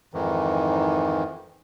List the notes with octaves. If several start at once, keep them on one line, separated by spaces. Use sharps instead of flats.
F2 G#2 D#3 E3